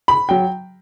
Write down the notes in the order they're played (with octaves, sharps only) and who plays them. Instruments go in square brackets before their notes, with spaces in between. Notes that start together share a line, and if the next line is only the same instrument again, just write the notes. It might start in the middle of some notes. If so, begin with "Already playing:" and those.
[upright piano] B5
F#3 G5